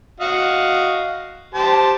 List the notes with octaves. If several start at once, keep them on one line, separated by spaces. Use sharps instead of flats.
F#4 D#5 F5
G4 C5 A5